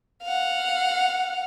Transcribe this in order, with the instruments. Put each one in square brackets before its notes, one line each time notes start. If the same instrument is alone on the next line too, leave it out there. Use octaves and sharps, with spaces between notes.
[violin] F5 F#5